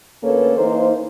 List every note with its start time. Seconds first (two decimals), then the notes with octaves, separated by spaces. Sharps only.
0.23 D2 A#3 C#4 A4 B4 C#5
0.57 E3 A#3 D#4 A#4 C5